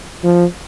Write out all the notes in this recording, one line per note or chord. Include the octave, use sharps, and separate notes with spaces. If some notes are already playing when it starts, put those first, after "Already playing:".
F3